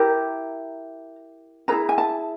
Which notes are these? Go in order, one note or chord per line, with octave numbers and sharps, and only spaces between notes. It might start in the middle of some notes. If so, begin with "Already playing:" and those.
Already playing: E4 G4 A#4 A#5
E4 G#4 B4 A#5
G#5
A5